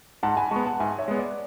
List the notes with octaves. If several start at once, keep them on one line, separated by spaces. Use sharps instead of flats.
G#2 F#5 A5
G#5 B5
G#3 B3 A5 C#6
F#5 A5
G#2 E5 G#5
C#5 E5
G#3 B3
D5